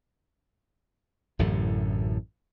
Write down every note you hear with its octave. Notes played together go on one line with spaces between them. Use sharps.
A1 F#2 A2 D3